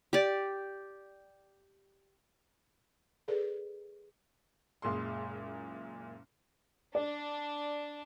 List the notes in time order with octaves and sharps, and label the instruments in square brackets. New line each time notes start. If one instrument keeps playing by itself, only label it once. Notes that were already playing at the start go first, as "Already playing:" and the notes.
[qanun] G4 D5
[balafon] G#4 A4 B4 D5
[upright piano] F#1 A#2 G#3 C6
[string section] D4 [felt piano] D5